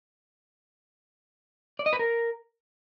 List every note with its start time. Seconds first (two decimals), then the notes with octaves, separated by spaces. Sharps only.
1.79 D5
1.86 D#5
1.93 B4
1.99 A#4